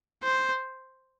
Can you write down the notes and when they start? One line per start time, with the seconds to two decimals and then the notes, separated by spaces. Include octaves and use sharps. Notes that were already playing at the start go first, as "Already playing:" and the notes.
0.23 C5